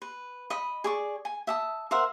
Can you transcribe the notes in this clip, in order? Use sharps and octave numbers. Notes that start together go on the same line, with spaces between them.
B4
D#5 B5
G#4 D5 C#6
G#5
E5 A5 D#6
A#4 C5 E5 F#5